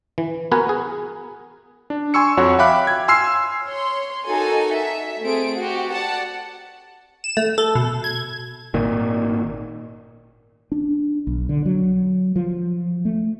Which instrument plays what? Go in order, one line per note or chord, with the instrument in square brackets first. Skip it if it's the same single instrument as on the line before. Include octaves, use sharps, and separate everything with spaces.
[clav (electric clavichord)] E3
B3 F#4 A#4 B4 G#5
G#4
[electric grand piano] D4
G#5 C6 C#6 E6 C#7
F2 F#4 C#5 F#5
E5 F5 G5 B5 D6 F#6
G#6
G#5 C6 E6 F6 C7
[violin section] C#5 C6
D#4 F#4 A4 A#4 G#5
E5
A3 C4 G#4 D7
F#4 G4
D5 F#5 A5
[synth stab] E7
A3
A4
B2
G#6
[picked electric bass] G#1 A#2 D#3
[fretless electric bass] D4
B1
D3
F#3
F3
A3